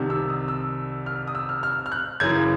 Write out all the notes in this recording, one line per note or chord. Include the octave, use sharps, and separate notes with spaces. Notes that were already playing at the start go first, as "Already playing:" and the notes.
Already playing: C2 C3 D#3
E6
D#6
E6
F6
D#6
E6
F6
F6
F6
F#6
F#2 C#3 E3 G#6